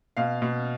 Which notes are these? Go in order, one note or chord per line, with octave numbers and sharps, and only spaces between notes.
B2 F5
B2